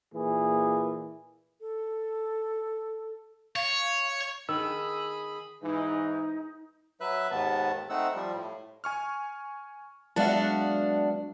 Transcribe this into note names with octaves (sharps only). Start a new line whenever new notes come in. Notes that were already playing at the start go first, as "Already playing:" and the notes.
A#2 E3 G#4
A4
C#5 F5
D#3 G#4 B5 E6
G#2 E3 D#4
F#3 B4 E5 F#6
D#2 G#2 D#3 B3 A5
A3 C4 D#4 F#5 E6
F3 G3
A2
G#5 C#6 F6
F#3 G#3 B3 D4 F#4 E5 F5 A5